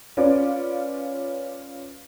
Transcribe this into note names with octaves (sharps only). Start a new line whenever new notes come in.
C#4 F4 B4 D5